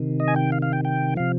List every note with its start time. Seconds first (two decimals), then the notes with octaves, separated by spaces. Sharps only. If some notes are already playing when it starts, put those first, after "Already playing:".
Already playing: C3 D#3
0.20 D#5
0.28 G#5
0.36 G5
0.52 F5
0.62 F5
0.73 G5
0.85 G5
1.16 C3 F3 F5